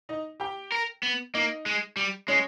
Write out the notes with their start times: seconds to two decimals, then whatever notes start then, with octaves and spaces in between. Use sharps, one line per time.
0.09 D#4 D#5
0.40 G4 G5
0.72 A#4
1.03 B3
1.34 A#3 D#4 D#5
1.66 G#3
1.97 G3
2.28 G#3 C#4 C#5